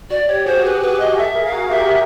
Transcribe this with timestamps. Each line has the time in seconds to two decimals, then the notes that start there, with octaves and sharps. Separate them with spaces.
0.10 F#4 D5
0.28 G4 C#5
0.46 F#4 G#4 C5
0.64 B4
0.82 B4
1.00 D#5
1.17 G4 A4 E5
1.35 G#4 A#4
1.45 F5
1.52 F#4 G#4
1.71 G4 E5